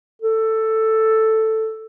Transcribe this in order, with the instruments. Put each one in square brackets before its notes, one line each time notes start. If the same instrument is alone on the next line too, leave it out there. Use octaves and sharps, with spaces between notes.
[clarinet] A4